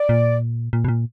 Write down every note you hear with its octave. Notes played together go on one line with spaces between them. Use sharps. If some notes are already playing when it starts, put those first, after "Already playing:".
Already playing: D5
A#2
A#2
B2
A#2